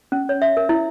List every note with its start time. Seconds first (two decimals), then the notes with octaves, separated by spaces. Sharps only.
0.12 C#4
0.29 C#5
0.42 E5
0.57 A#4
0.69 E4